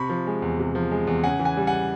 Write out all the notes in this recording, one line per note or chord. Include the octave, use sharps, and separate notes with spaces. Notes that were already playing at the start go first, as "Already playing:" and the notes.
Already playing: C3 B5 C#6
F3
G#3
E2
C3
F3
G#3
E2
C#3 F#5 G#5
E3
F#5 G#5
G3
F#5 G#5